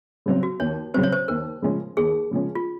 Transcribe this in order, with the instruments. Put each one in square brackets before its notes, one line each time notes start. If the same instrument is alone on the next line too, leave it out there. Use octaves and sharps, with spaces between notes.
[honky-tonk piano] C#3 F#3 C4
[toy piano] F#4
[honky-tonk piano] D#2 [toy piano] C#5
[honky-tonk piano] C#3 F#3 C4 [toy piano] C5
[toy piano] C#5
C5
[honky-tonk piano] D#2 [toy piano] A#4
[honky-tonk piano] C#3 F3 G#3 C#4
[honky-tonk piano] D#2 [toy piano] G#4
[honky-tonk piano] C#3 F3 G#3 C#4
[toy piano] F4